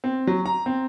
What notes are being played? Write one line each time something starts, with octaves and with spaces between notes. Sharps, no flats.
C4
F#3
A#5
C4